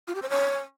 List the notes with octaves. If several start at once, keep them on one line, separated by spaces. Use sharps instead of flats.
F4
G4
C5
C#5